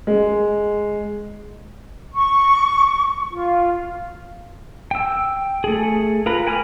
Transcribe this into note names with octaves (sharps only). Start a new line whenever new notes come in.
G#3
C#6
F4
G5 E6
A3 G#4
F4 A#4 B4 A#5 B5
G5 G#5 B5 D6 F6